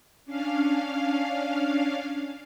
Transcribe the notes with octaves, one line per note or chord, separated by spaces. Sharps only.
C#4 D4 F5